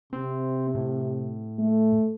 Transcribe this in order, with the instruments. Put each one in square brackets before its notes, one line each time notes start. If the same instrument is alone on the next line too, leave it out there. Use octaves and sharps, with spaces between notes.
[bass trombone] C3 [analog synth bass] C4
[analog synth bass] A2
[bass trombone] A3